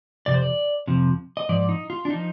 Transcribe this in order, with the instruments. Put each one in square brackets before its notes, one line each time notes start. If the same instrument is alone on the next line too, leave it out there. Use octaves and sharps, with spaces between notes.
[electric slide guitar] F2 C3 D5
C5
D5
F2 C3 F3
D#5
G#2 F3 D5
D#4
F4
D4
F3 D#4